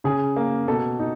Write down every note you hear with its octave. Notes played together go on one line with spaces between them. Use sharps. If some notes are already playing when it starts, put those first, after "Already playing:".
C#3 G#4
A#3
B2 A4
D#4